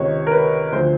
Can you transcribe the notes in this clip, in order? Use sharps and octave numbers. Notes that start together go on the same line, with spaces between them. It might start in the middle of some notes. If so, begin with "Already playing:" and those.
Already playing: C#2 C3 D#3 C#5
A#4
B4
D2 D3 F3 C5